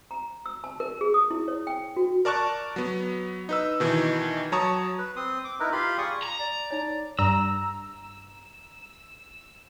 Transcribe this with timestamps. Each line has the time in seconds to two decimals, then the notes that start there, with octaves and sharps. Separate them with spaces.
0.11 A#5
0.46 E6
0.64 A5
0.80 A#4
1.01 G#4
1.14 D#6
1.31 E4
1.48 C#5
1.67 G5
1.96 F#4
2.25 A#4 D5 A5 C#6 F#6
2.76 F#3 B3
3.49 D#4 B4 E6
3.80 B2 D#3 E3
4.52 F#3 C#5 A5 A#5 C#6 D#6
4.98 B4
5.16 C4 C6 D#6
5.44 D6
5.60 D#4 E4 A#4 B4
5.72 F4 G4 F5 B5 C6
5.98 G#4 D5 C#6 D#6
6.23 A#5
6.40 D5
6.71 D#4 C#5
7.19 G2 A#5 E6